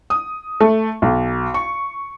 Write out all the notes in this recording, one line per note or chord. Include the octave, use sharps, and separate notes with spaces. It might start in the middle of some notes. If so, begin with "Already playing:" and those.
D#6
A3
B1
C#6